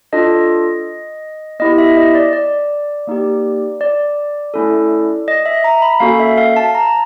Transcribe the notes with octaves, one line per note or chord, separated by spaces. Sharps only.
D4 F4 A4 D#5
B3 E4 G4 D#5
E5
D#5
D5
D5
A#3 D#4 G4
D5
A3 C#4 E4 A4
D#5
E5
A#5
B5
A#3 C#4 F#4 A4 F5
E5
F5
A5
A#5